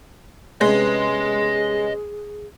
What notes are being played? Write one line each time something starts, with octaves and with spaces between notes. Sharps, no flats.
C3 G#3 B3 C#4 G#4 D#5 C6